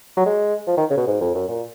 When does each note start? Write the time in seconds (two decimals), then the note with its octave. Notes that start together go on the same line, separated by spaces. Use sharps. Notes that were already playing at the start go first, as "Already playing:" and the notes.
0.17 F#3
0.26 G#3
0.67 F3
0.77 D#3
0.90 C#3
0.97 B2
1.07 G#2
1.21 F2
1.34 F#2
1.48 A#2